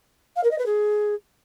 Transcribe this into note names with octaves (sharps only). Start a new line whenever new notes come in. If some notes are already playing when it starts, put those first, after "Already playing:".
F5
A#4
D#5
B4
G#4